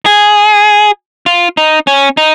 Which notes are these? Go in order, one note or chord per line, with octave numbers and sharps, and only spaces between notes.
G#4
F4
D#4
C#4
D#4